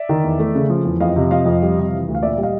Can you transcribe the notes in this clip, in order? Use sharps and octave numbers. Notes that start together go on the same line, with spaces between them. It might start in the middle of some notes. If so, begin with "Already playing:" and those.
Already playing: D5 E5
D#3
E2
A3
C#3
F3
E2
F2 D#5 F5
C3
F3 D#5 F5
F2
G3
C3
E3
D2
F5
A#2 D5 E5
G3
D#5 F5